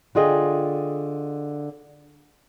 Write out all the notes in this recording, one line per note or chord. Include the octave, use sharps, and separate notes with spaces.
D3 F4 G#4 D#5 G5